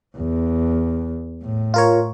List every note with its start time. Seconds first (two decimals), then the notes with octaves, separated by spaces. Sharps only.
0.17 E2
1.43 A2
1.74 F4 A#4 C#5